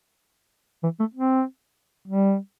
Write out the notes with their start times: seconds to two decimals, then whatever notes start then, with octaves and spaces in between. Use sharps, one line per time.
0.83 E3
0.99 A3
1.14 C4
2.08 G3